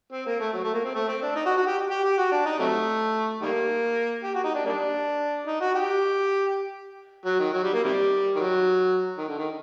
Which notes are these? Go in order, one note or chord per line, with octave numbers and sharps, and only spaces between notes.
C4
A#3
A3
F#3
A3
A#3
C4
A3
C4
D4
D#4
F#4
F#4
G4
G4
G4
F#4
D4
D#4
C3 F#3 A3
D#3 G3 A#3
G4
F#4
D#4
D4
G3 A#3 D4
D#4
F#4
G4
F#3
D#3
F#3
G3
A#3
C3 D#3 G3
D#3 F#3
D#3
D3
D#3